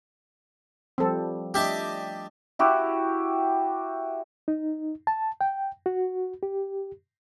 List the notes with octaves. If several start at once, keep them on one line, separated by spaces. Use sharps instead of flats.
F3 G3 C4 A4
A3 D4 G4 D#5 E5 A5
E4 F#4 G4
D#4
A5
G5
F#4
G4